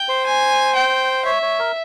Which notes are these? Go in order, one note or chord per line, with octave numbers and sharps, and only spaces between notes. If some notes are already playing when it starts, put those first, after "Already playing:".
Already playing: G5
C5
G#5
G5
C#5 E5
C#5
A#4